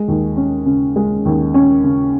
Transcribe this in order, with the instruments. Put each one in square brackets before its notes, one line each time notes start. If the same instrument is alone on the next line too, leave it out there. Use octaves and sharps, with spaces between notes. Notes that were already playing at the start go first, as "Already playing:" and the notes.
Already playing: [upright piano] G#3
D#2
C#4
C#3
G#3
D#2
C#4
C#3